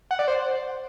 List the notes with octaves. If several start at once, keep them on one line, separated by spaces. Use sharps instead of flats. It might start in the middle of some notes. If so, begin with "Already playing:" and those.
F#5
D5
C5